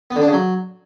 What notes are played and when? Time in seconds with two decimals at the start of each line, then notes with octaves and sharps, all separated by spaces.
0.11 B3
0.16 D3
0.22 D4
0.27 C#3
0.33 F#3